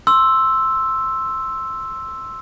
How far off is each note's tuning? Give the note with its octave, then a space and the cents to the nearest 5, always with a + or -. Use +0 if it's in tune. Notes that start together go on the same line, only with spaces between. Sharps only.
C6 +10 E6 +0